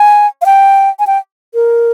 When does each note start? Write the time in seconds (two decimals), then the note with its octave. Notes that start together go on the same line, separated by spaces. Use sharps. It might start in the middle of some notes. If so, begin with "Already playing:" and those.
Already playing: G#5
0.42 F5
0.46 G5
0.99 G#5
1.07 G5
1.54 A#4